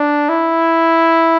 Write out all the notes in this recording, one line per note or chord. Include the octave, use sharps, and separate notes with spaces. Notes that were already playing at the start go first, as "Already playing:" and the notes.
Already playing: D4
E4